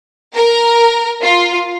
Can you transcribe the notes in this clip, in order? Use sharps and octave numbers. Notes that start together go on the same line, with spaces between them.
A#4
F4